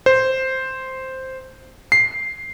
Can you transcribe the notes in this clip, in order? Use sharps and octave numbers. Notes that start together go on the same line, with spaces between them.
C5
C7